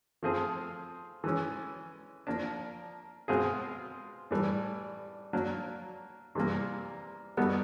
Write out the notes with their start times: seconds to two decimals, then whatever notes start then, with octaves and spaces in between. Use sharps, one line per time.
0.23 F3 A3 C4 F4 G#4
1.24 E3 G#3 C#4
2.27 F3 A#3 D4
3.28 B2 G#3 C4 F4 G#4
4.31 A2 E3 G3
5.33 F#3 A#3 D4
6.35 C3 E3 G3 A#3
7.37 G3 B3 D#4 F#4 A4